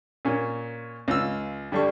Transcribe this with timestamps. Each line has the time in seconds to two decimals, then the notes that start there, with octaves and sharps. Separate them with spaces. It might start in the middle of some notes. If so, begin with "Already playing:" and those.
0.25 A#2 C#4
1.08 C#2 F4 E6
1.72 G2 D3 G3 D4 C#6